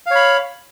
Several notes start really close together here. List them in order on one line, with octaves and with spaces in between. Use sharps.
F5 C#5 B5